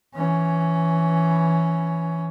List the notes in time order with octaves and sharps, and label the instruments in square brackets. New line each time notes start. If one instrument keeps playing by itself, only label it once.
[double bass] E3 C#4